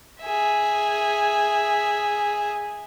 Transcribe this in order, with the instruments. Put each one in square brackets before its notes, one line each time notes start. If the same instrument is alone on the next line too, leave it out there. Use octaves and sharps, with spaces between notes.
[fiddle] G#4 E5